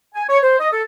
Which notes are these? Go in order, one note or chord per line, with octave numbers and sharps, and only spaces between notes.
G#5
C#5
C5
D#5
A4